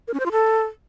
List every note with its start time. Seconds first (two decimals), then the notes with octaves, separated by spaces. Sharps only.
0.08 A#4
0.14 C#4
0.20 C5
0.26 F4
0.32 A4